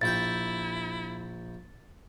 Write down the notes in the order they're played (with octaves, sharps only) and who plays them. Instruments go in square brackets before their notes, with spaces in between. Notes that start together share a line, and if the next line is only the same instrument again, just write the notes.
[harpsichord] A#1 G5 [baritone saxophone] E4 [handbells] A6